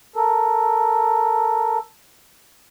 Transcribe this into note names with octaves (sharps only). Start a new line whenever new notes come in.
A4 A#4